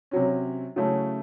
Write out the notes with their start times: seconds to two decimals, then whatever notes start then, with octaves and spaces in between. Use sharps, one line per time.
0.11 C3 F#3 C#4
0.76 C#3 F#3 A3 C#4 E4